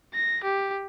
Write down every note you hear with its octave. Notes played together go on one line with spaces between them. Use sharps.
A#6
G4